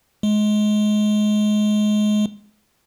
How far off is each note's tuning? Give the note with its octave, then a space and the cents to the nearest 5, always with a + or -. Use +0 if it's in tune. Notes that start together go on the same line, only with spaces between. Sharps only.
G#3 +25